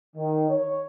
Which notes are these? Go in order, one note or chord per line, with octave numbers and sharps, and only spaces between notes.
D#3
C#5